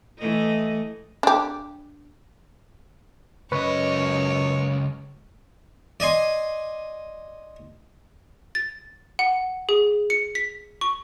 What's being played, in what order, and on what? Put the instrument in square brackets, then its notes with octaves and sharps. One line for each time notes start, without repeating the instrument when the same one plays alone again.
[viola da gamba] E3 A3 D#5
[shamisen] D4 G4
[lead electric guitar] C#2 D#5 [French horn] F#2 [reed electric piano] B4 C#6 [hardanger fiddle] C#5
[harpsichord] D5 D#5 G#5 C6
[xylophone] A6
F#5
G#4
C#7
B6
C#6